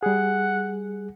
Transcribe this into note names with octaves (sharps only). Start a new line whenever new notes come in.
G3 G#4 F#5